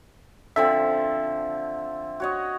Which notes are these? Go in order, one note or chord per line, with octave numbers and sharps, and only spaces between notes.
D3 F3 C4 E5
F#4 C#5 D#5